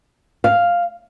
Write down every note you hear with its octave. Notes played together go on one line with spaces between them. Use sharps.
F5